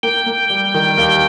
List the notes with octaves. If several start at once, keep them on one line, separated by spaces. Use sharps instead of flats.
A#3 G5
A#3
G3
D#3
D#2